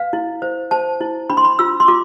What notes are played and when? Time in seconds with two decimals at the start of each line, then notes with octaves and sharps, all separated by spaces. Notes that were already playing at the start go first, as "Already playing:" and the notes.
Already playing: B4 F5
0.13 E4
0.42 C5
0.71 C5 A5
1.01 E4
1.30 D4 B5
1.37 C6
1.45 B5
1.59 F4 E6
1.80 C6
1.88 F4 D6